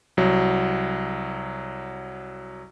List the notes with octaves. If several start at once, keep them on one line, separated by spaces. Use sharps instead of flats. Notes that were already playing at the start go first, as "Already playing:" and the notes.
C2 F#3